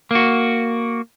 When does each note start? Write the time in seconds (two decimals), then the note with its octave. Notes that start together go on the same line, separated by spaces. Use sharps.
0.11 A#3 F#4